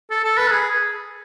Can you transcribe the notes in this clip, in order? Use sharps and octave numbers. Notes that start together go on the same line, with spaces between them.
A4
A4
B4
G#4